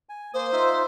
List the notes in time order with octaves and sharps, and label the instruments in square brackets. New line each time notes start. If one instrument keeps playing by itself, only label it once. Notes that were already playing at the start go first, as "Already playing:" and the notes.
[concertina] G#5
[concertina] A#3 D#6 [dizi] C5
[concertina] D#4 F4 E5